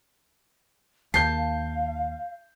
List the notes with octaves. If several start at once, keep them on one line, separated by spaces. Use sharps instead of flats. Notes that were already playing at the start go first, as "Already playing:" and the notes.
D#2 F5 A5 G6 C7